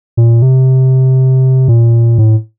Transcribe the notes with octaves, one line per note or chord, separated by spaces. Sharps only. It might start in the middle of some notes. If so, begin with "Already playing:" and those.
A#2
C3
A#2
A2